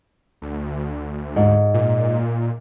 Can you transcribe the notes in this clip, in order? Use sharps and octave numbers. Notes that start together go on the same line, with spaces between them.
D2
G#2
A#2